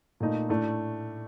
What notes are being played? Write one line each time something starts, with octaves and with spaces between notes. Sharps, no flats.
A#2 A3 D#4
A2 A3 D4